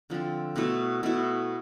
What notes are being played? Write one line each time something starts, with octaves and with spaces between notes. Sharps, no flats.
D3 F3 C4
B2 A3 E4
B2 A3 E4